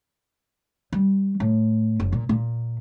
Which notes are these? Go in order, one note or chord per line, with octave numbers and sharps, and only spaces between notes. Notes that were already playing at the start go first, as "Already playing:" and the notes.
G3
A2
F#1
A#2
A#2